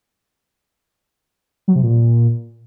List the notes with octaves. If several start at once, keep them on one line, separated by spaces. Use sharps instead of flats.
F#3
C3
A#2